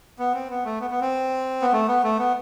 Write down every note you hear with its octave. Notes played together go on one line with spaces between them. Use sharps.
B3
C4
B3
A3
B3
B3
C4
B3
A3
B3
A3
B3